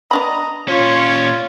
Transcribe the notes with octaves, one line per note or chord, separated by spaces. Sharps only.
B3 D4 D#5 A#5 B5
A#2 C#4 F4 C#5